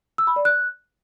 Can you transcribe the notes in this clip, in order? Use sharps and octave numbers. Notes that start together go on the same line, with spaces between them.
E6
B5
D5
F#6